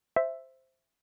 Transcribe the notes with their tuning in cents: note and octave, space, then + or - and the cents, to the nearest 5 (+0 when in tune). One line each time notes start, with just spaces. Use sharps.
C5 +0 E5 +5